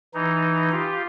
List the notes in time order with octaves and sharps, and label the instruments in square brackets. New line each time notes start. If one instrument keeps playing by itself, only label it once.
[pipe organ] E3 D#4
F4 G4